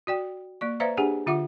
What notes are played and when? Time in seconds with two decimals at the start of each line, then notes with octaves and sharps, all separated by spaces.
0.07 F#4 D5 G5
0.61 A#3 D5 C#6
0.80 B4 C5 D5 E5 F5 A#5
0.97 D4 G4 G#4 F#5 G#5
1.27 D3 F4 E5 F#5 D6